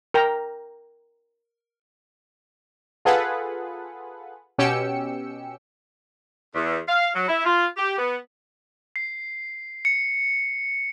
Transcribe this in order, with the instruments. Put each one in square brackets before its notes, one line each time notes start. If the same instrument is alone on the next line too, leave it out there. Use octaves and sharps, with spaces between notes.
[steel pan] A#4 G5 A#5
[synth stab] F4 G#4 A4 B4 F#5
B2 C#4 G4 G5 E6 C#7
[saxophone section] E2
F5
F#3
E4
F4
G4
B3
[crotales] C7
C#7